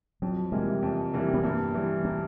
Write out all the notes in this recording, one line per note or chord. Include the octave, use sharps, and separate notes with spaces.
F2 F#3
C3 E3 G3 G#3 A#3
F2
C3 E3 G3 A#3
B3
G2 A#3
E3 G3
A#3